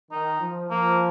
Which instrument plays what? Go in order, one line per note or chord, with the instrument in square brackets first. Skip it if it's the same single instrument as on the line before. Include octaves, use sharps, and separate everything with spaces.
[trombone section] D#3 [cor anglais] D#4
[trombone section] F3
[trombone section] F3 [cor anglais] A#3